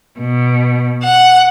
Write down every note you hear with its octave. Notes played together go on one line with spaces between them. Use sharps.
B2
F#5